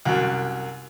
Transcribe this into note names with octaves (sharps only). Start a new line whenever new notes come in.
C2 F#2